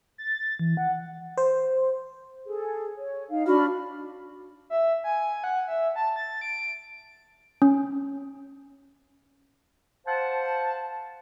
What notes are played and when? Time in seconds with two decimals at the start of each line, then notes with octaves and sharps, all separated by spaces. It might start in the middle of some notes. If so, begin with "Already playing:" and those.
0.18 A6
0.59 E3
0.77 F#5
1.37 C5
2.45 G#4 A4
2.98 C#5
3.30 D#4 F5
3.47 D4 F#4 B5 F6
4.70 E5
5.04 G#5
5.44 F#5
5.68 E5
5.96 A5
6.16 A6
6.41 D7
7.62 C#4
10.07 C5 F5 F#5 A5